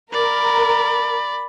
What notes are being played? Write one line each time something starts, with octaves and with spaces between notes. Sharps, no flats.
A#4 D5 B5